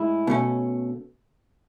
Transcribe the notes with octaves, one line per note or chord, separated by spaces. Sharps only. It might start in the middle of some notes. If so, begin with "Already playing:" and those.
Already playing: A2 G#3 E4 G#4
B2 A3 C#4